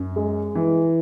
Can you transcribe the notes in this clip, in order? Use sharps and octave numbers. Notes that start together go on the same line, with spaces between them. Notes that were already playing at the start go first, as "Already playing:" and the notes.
Already playing: F#2
G#3
E3